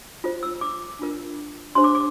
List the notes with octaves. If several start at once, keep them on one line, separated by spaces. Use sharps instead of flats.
F4 A4 C5
E6
D6
D4 F4 A#4
D4 G4 C5 C6
D6
D6